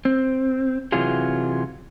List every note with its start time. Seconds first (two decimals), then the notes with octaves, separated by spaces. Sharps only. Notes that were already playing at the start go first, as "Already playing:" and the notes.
0.05 C4
0.92 C3 E3 F#3 F4 G#4